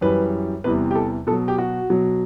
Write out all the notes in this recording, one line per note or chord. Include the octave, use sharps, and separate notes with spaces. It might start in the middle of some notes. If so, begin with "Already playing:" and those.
F#2 E3 G3 B4
E2 C3 E3 G3 B4
G4
A4
B2 F#3 A4
G4
F#4
B2 F#3